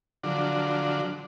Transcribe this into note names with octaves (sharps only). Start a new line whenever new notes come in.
D3 F3 F#3 D4